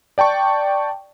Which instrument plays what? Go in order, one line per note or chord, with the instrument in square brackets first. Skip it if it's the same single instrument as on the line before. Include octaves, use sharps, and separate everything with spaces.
[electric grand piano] D5 G5 A5 C#6